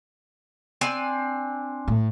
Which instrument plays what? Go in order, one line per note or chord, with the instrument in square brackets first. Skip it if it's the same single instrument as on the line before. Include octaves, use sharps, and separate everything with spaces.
[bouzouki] C4 D4 G#5
[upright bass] A2